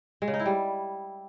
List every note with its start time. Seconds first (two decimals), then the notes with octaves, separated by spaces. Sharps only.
0.22 G#3
0.28 C#3
0.34 D#4
0.40 E4
0.46 G3